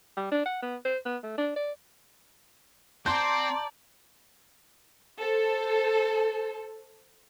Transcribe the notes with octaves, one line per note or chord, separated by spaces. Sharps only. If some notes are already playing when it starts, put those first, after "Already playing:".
G3
D4
F#5
B3
C5
B3
A3
D4
D5
C4 D5 A5 A#5 C6 G6
A4 C5